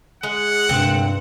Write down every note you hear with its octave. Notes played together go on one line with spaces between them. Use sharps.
G#3 F#5
D2 G2 C3 G#3 C4